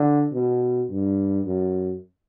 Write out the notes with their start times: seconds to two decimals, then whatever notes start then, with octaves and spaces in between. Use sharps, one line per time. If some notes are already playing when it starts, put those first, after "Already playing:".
Already playing: D3
0.33 B2
0.90 G2
1.46 F#2